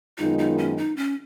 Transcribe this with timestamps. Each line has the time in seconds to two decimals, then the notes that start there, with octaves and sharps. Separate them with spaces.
0.18 F#2 D#3 G#3 B3 D#4 F4
0.38 D#4
0.58 C#4
0.77 D#4
0.97 C#4